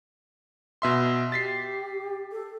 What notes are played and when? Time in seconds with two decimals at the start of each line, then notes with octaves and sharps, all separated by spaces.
0.82 B2 E5 C6
1.32 G4 A6 B6 C7
2.32 A4